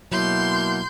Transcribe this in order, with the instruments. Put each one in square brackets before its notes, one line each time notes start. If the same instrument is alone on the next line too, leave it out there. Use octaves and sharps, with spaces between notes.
[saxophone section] B2 A#3 E4 [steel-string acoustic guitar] F#3 [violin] C6 G6